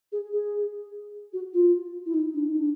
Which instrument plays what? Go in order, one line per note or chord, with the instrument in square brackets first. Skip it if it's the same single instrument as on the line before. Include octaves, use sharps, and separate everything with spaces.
[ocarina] G#4
G#4
F#4
F4
E4
D#4
D4
D#4
D4